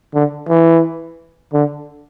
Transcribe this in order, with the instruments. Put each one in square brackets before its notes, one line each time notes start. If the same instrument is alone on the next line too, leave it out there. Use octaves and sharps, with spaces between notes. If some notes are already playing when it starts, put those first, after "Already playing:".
[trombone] D3
E3
D3